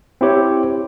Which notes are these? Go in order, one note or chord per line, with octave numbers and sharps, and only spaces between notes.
C4 E4 G4 C#5